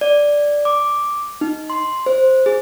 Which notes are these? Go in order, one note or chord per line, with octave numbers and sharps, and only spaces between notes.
D5
D6
D#4
C6
C5
G#4